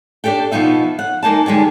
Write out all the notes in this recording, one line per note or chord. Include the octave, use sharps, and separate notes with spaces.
D4 D#4 G4 A4 G5
B2 F3 G#3 B3 D#4 E5
F#5
G#3 A#3 D#4 A5
D3 D#3 G3 G#3